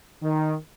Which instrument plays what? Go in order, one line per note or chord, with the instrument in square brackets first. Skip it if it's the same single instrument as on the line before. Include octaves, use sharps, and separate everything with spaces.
[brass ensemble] D#3